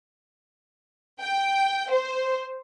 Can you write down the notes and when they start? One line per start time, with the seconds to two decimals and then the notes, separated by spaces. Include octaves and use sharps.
1.21 G5
1.90 C5